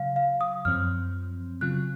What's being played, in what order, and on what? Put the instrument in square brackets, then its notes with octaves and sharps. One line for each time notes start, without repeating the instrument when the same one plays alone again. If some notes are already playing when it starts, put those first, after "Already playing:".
Already playing: [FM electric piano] C#3 F#3 [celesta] F5
[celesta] F5
D#6
[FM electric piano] F#2 F3 C4 [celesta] F6
[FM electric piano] C#3 F#3 C4 F4 [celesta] F#6